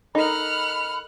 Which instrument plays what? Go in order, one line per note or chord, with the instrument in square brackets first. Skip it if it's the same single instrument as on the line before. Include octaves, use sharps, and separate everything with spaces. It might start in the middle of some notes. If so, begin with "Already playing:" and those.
[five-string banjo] D#4 [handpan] A4 A#4 D#5 [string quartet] F#5 F6 [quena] B5